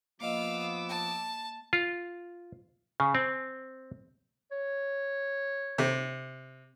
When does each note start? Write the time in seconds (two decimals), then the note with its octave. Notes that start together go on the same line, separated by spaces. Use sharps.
0.21 F3 A#3 B3 D#5 F5 D6 E6
0.89 A5
1.73 F4
3.00 C#3
3.15 C4
4.52 C#5
5.78 C3